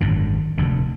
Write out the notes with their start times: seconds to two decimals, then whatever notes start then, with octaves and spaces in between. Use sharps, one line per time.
0.01 G#1 F#2 D3
0.58 F1 D2 D3